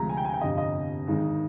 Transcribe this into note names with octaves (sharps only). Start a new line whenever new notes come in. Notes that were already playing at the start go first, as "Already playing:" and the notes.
Already playing: D2 C3 F3 G#3 A#5
G#5
G5
G#5
G5
G1 F2 C3 D#5
D#5
G#1 G#2 D#3 G#3